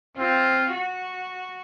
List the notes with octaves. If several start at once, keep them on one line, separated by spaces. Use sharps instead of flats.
C4 F4
F#4